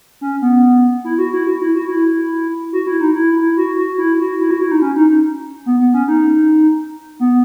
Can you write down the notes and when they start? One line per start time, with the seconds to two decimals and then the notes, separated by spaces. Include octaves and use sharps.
0.21 C#4
0.42 B3
1.04 E4
1.18 F#4
1.33 E4
1.47 F#4
1.61 E4
1.75 F#4
1.89 E4
2.73 F#4
2.87 E4
3.01 D#4
3.14 E4
3.35 E4
3.57 F#4
3.78 F#4
3.98 E4
4.20 F#4
4.41 E4
4.51 F#4
4.61 E4
4.71 D#4
4.82 C#4
4.96 D#4
5.10 D#4
5.66 B3
5.80 B3
5.94 C#4
6.08 D#4
7.20 B3